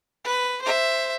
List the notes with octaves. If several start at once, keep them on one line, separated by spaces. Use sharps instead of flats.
B4
C5 E5